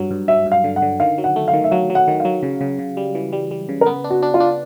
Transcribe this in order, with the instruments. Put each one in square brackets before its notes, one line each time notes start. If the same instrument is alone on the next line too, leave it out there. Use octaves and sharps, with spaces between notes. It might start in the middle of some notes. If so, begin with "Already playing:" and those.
Already playing: [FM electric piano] G2 F#3
G2
[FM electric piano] F#3 [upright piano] E5
[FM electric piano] G2
[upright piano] F5
[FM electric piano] D3
[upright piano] F#5
[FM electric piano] D3
[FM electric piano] D#3 [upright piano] F5
[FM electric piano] F#3
[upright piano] F#5
[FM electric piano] A3
[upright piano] F5
[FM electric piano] D#3
[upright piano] E5
[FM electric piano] F#3 [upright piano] F5
[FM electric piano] F#3
[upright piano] F#5
[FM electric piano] D#3
[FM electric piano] F#3 [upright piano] F5
[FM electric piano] C#3
C#3
C#3
G3
E3
G3
G3
C#3
[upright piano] A#4
[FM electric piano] B3 [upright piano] B4
[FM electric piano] D4
[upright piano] F#4
[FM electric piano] D4
[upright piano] F4
[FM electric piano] D4